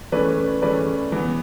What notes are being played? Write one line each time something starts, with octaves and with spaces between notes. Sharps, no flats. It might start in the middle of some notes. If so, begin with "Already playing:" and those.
E3 A3 C#4 B4 D5
E3 A3 C#4 B4 D5
E3 B3